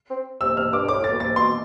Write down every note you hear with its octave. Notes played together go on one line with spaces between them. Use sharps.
C4
C3 E6
C3 F6
G2 D6
G2
A2 D6
A2
A6
B2
C3 A6
B2 C6